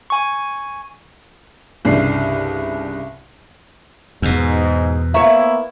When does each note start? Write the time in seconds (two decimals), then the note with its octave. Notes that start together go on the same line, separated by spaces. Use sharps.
0.10 G#5 C#6
1.85 C2 G2 C#3 D5 C7
4.22 E2 G#2 B2
5.14 A#3 B3 E4 C#5 E5 F5 A#5 C#6